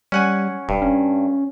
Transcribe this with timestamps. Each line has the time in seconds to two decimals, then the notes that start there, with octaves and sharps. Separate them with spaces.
0.12 G3 C#4 F#5 G#5
0.69 E1 G2
0.82 C#4